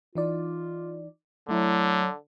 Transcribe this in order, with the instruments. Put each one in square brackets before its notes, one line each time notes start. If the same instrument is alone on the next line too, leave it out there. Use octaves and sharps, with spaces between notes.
[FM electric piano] E3 D#4 D5 [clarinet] F4
[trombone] D3 [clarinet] F#3 [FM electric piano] A3 E4